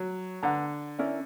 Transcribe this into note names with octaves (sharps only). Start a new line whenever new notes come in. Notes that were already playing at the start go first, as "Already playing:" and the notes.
Already playing: F#3
D3 B4 F#5 A#5
C#4 E4 A#4 D5